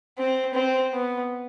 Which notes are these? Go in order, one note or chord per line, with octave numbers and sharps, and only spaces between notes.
C4
C4
B3